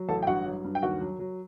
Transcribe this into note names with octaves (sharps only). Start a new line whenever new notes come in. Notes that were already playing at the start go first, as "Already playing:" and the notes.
Already playing: F#3
A1 A4 A5
G5
G2 F#4 F#5
F#3
G2
G5
D#2 F#4 F#5
F#3
F#3